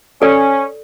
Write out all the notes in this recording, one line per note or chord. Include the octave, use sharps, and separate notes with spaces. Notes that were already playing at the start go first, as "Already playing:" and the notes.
C#4 A4 D5